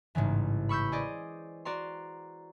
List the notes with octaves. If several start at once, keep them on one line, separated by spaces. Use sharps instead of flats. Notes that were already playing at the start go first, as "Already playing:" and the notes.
A1 G#2 C#3 E3
B5 C#6 E6 G6 B6
G#4 C5 D5 D#5
F#4 D5 A#5 C6